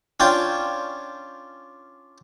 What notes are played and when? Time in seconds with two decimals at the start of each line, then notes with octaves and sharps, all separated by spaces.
0.20 C#4 D4 F4 G5